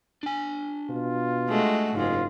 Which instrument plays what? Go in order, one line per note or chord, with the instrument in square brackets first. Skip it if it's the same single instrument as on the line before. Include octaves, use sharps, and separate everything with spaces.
[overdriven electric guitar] D4 G#5
[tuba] B2 [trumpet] F4
[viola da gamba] G#3 A3 F#4
[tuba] F#1 [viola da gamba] G#2 G#3 [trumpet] F4